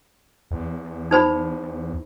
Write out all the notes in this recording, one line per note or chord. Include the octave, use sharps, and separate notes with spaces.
E2
D#4 C5 B5